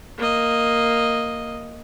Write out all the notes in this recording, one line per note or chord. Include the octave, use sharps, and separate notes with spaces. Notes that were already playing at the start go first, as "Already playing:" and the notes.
A#3 D#5